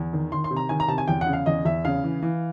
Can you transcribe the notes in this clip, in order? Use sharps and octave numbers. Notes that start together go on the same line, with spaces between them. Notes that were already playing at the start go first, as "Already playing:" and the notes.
Already playing: E2
D#3
D#3 C6
C6
C3
A#5
D#3 G#5
A#5
C3 A5
G#5
E2 G5
F#5
C#3
F5
E2 D#5
E2 E5
C#3 F5
E3
E3